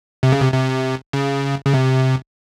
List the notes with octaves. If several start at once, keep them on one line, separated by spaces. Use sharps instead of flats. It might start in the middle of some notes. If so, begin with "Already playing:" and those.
C3
C#3
C3
C3
C#3
C#3
C3